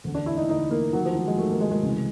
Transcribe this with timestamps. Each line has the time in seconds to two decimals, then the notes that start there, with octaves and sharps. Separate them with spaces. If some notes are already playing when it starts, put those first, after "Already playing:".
0.04 E1 D2 D3
0.15 D4
0.26 E4
0.37 D#4
0.49 E1 D2 D3 D#4
0.70 A#3
0.93 D#2 D#3 F#3
1.05 F3
1.15 F#3
1.27 G#3
1.38 D#2 A3
1.42 D#3
1.50 A#3
1.61 G#3
1.71 G#3
1.83 C#2 C3 E3